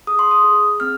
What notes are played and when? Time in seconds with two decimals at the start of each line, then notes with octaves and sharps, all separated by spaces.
0.07 G#4 D#6
0.19 C6
0.31 D#6
0.44 G#4
0.80 C4 F6